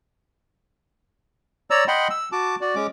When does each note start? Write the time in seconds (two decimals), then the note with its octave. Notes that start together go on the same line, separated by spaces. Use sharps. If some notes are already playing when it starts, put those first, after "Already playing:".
1.70 C#5 D5 A#5 E6
1.88 D#5 F#5 G5 B5 C6
2.10 E6
2.32 F#4 A5 D6
2.61 F#4 D5
2.75 G#3 C#4 D6